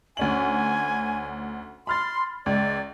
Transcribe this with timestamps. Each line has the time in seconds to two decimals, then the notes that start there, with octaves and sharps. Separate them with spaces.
0.17 D2 C#4 G#5 F#7
1.87 B5 C6 F6 A6
2.46 C#2 D5